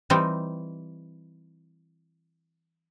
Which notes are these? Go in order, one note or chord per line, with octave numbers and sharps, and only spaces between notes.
E3 G3 C4 D#4